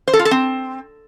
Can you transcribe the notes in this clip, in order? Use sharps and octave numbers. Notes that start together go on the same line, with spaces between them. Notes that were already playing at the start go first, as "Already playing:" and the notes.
C5
A4
F4
A4
C4